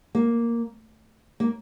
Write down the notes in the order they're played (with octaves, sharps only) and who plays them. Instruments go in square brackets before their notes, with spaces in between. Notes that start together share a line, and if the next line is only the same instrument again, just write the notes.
[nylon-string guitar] A#3
A#3